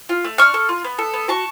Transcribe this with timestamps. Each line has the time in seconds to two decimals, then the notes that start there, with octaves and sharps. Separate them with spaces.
0.09 F4
0.24 A3
0.38 D4 C#6 F6
0.54 A4
0.69 F4
0.84 B3
0.98 A4
1.14 B3
1.28 F#4 A5 C#6